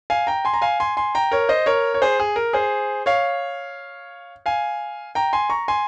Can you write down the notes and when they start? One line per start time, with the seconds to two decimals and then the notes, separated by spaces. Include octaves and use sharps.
0.10 F5 G#5
0.27 G5 A#5
0.45 G#5 C6
0.54 A#5
0.62 F5 G#5
0.80 G#5 C6
0.97 G#5 C6
1.15 G5 A#5
1.32 A#4 C#5
1.49 C5 D#5
1.66 A#4 C#5
1.94 C#5
2.02 G#4 C5
2.20 G#4
2.36 A#4
2.53 G#4 C5
3.06 C#5 F5
4.46 F5 G#5
5.15 G5 A#5
5.33 G#5 C6
5.50 A#5 C#6
5.68 G#5 C6